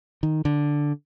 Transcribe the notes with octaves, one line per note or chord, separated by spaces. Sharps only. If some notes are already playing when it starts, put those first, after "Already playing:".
D#3
D3